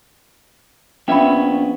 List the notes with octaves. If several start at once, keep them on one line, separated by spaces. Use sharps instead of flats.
A#1 B3 C#4 E5 G5 B5